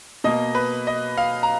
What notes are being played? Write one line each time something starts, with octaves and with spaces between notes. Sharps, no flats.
B2 A#3 D#5
B4
D#5
F5
A#5